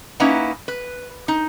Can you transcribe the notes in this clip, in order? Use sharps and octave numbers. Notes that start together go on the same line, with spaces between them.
A#3 C#4 D#4 E4 B4 F#5
B4
D#4